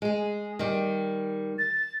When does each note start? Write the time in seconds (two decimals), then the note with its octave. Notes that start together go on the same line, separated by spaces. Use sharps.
0.02 G#3 G#4
0.59 D#3 G3
1.59 A6